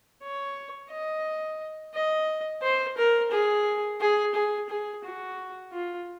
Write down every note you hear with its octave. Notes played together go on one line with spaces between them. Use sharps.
C#5
D#5
D#5
C5
A#4
G#4
G#4
G#4
G#4
F#4
F4